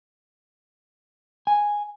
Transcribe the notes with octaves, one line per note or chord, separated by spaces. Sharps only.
G#5